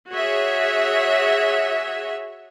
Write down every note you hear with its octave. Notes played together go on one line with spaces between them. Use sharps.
F#4 G#4 C#5 E5